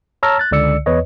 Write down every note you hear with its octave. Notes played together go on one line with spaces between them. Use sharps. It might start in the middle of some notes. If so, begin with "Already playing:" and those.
C#5 A5 A#5 E6 F6 A#6
F#6 A6
C#2 D3 D5 E6 C#7
E2 B4 C#5 D#5